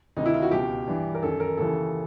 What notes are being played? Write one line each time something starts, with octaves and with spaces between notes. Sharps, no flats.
D2 C3 D#3 D#4
E4
F4
F#4
C#2 B2 G4
G2 E3
A#4
F#2 D#3 A4
A#4
D#2 C#3 E3 A4